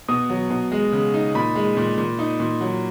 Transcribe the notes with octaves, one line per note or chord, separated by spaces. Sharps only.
B2 D#6
F#3
B2
G#3
C#3
D#4
A#2 B5
G#3
A#2
A#2
D#4
A#2
F#3